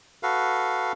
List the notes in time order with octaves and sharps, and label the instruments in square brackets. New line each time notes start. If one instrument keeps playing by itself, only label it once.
[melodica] F#4 A4 B4 F5